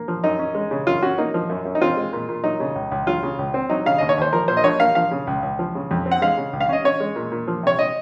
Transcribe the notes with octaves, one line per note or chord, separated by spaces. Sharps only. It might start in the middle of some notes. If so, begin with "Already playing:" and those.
Already playing: A#3
F3
F#2 D#4
C#4
G#3
C#3
F#2 F4
C#4 F#4
A#3 D#4
F3
F#2
F#2
D#4
C4 F4
G#3
A#2
A#2
F#3 D#4
C#3
C#2
C#2
F#3 F4
C#3
C#2
C4
F#3 D#4
C#3 F5
D#2 D#5
C#5
D#2 C5
F3 A#4
A#2 C5
D#5
A#1 C#5
A#3 F5
F3 F5
C#3
C#2
C#2
F3
C#3
F2
C4
F#5
G#3 F5
C#3
C#2
F5
C#4 D#5
C#4 C#5
G#3
A#2
A#2
F3
C3 C#5
D#5